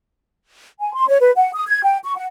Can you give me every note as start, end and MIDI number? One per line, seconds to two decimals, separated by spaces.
0.80 0.93 80
0.94 1.05 84
1.08 1.18 73
1.20 1.31 71
1.36 1.50 78
1.55 1.64 87
1.68 1.82 92
1.84 1.98 79
2.05 2.16 85
2.16 2.25 78